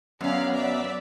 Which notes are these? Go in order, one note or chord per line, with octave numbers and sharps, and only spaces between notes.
F#2 F#3 B3 C#4 D5 F5 A#5
D5 E5